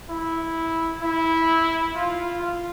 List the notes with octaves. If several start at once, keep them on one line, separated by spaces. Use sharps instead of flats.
E4
E4
F4
F4